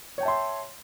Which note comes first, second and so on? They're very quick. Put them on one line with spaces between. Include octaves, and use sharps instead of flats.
C#5 G5 A5 E5 C6